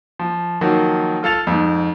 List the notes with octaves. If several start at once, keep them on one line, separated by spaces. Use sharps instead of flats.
F3
D#3 F3 F#3 A#3
F4 A4 F5 A6 F7
F2 G#2